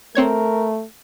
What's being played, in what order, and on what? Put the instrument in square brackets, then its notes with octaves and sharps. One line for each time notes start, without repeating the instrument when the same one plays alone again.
[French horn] A3 [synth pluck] C4 C#5 G#6 [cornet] A#4